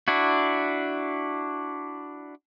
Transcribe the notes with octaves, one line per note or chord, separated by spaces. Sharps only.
D4 E4 F#4